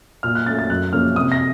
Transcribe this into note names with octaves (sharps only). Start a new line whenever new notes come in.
A#2 F6
F#6
A3 C#4 A6
A6
F#2 F#6
C#3 F3 A#3 C#4 F6
C3 D#6
A#6